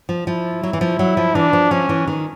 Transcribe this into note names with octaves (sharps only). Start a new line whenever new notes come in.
F3
F3 E4
F#3
E3
F3
F#3
F3
E3 D4
F3
F3 C#4
E3
D#3